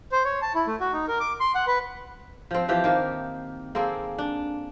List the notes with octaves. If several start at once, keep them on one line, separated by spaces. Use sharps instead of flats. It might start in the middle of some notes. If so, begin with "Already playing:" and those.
C5
C#5
A5
E4
A3
F#4
D#4
A#4
D6
C6
F#5
B4
F3 C4
E3 F3 G4
D#3 A#3
A#3 C4 G#4 A4
D4